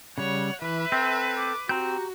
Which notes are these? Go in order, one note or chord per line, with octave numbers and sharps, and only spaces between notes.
C#3 G3 C#5 F#5
E3 B4 E5
C4 A4
D6
C4 F#4 G4 A#5 G6